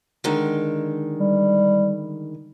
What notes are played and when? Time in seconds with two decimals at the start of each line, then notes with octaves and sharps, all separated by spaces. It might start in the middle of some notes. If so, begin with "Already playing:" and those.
0.24 D3 D#3 G#3
1.19 G3